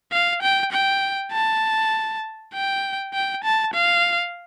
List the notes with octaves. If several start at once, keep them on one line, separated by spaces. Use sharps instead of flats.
F5
G5
G5
A5
G5
G5
A5
F5